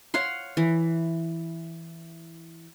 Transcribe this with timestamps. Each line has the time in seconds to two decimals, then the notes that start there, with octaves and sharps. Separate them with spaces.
0.14 C#5 F5 F#5 C6
0.57 E3